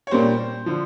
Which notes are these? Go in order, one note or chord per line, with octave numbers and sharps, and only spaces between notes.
C#5
A#2 G3 A#3 C5
D3 F3